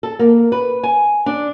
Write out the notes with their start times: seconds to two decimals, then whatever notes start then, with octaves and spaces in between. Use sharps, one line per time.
0.03 A4
0.19 A#3
0.52 B4
0.83 G#5
1.26 D4